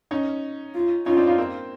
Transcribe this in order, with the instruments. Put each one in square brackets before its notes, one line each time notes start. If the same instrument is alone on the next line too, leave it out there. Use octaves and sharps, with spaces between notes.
[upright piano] C#4 D#4
[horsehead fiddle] F4
[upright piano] C#4 D#4 [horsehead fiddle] F4
[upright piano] C4 D4
D#4 F4
A#3 C4